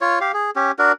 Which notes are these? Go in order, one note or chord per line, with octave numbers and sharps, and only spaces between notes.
F4 C#5
G4 F5
G#4
C#4 G4
D4 F#4 A#4